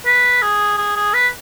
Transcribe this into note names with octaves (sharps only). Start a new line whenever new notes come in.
B4
G#4
G#4
G#4
B4